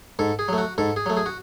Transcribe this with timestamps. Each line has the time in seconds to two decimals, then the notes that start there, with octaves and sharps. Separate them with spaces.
0.19 G#2 A4
0.39 G#4
0.48 F#3 A3
0.58 F#4
0.78 G#2 A4
0.96 G#4
1.06 F#3 A3
1.17 G#4
1.26 F#4